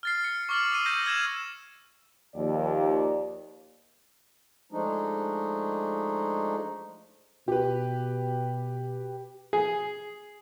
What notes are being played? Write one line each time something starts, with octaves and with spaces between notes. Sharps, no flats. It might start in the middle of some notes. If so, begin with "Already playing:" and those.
F6 A6 C7
C#7
C#6 D6 F6 A6 F#7
D#6 E6 C7 D#7
D6 G6 A#6 D#7
E6 G#6 E7
D#2 F3 D5
F3 G#3 A3 D4 D#4
B2 G4 B4
G#4